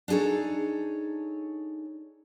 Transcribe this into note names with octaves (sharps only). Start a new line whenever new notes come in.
D4 D#4 G#4 A4 C#5